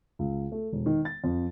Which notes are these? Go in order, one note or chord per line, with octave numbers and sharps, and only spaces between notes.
C#2
A3
E1
D#3
A6
F2